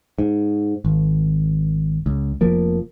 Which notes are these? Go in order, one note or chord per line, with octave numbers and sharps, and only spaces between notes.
G#2
G#1
C#2
F1 F3 A#3